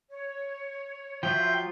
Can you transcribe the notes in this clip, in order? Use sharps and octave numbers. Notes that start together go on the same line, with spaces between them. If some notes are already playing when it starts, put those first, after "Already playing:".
C#5
F3 F#3 F4 E5 G5